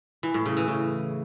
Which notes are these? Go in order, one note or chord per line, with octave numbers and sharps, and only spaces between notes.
E3
A2
C#3
E3
C#3